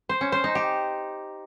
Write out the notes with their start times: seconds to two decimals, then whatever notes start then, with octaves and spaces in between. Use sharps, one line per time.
0.09 C5
0.21 C#4
0.32 C5
0.44 D#4
0.55 G4